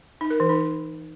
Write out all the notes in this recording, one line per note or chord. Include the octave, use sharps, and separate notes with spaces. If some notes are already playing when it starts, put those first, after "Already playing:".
D#4
A#4
E3
D#4